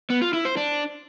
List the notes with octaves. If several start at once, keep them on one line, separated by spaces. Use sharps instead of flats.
B3
F4
E4
C5
D4